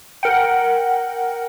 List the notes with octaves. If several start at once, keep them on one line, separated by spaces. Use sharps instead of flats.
A#4 F#5 G5